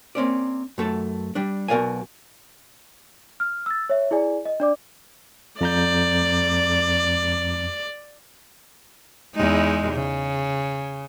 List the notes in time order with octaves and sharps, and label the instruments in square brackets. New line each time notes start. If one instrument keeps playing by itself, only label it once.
[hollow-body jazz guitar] A#3 C4 C#4 D5
F#2 A3 A4
G3 D4
B1 B2 A#4 D5 F5 G#5
[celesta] F6
E6 A6
C#5 E5
E4 G#4 D5 G#5
D#5
D4 D5 D6
[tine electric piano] F2 A#5 G6 [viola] D5
[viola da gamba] E2 G#3 D#4
C#3